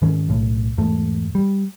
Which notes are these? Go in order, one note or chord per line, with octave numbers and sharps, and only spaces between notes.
G#2 D#3 C#4
B1 A2
E2 G#2 A3
G3